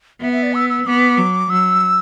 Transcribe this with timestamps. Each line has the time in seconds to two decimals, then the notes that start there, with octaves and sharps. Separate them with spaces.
0.21 B3 E5
0.32 E5
0.43 D5
0.54 E6
0.70 E6
0.86 B3 D6
1.18 F#3
1.50 F#3 E6